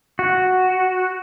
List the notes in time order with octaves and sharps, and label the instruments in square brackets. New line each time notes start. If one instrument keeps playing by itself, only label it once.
[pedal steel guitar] F#4